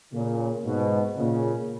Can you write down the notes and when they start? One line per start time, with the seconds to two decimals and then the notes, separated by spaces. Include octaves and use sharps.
0.13 A#2 C#3
0.65 G#2 B2
1.18 A#2 C#3